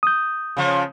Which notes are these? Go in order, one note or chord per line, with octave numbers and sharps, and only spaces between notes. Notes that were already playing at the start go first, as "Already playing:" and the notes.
D#6 G6
C#3 F3